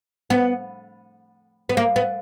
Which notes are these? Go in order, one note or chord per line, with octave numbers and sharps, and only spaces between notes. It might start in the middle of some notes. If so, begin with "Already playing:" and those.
B3
B3
A#3
B3